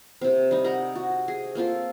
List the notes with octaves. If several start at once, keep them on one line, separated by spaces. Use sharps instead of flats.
C3 C4
G3 D#4
A#4 F#5 A#5
F#4
G#4
A#3 C4 F4 A4